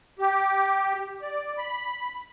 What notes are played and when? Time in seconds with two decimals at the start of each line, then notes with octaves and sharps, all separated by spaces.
0.19 G4
1.22 D5
1.58 B5